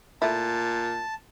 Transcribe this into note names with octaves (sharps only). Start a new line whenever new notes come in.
A#2 A3 E4 A5